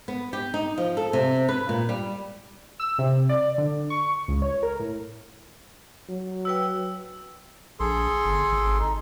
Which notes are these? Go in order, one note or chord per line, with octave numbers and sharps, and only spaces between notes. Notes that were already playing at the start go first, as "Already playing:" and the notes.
B3
G4
D#4
F3
A4
C3
B4
A#2
G3
E6
C3
D5
D3
C#6
C#2
C#5
A#4
A2
F#3
F#4 B4 G5 E6
A#1 G#4 A4 C6
G1
G#1
D#4